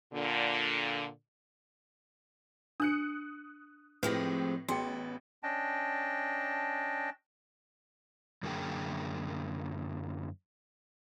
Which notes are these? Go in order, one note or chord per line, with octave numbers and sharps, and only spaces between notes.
A#2 D3
D4 D#6 F#6 C#7
A2 F3 G#3 C4 G4 B4 A#6
A1 B3 F#4 G#4 G5
C#4 D4 D#5 G5 A5
F#2 D3 A#3 G4 G#4 G5